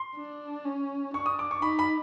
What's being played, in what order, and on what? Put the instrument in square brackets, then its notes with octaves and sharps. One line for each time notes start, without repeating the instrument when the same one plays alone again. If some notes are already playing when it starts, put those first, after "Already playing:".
Already playing: [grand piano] C6
[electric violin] D4
C#4
[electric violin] D4 [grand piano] C#6
[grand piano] D#6
D6
C#6
[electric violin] D#4 [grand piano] B5
[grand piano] B5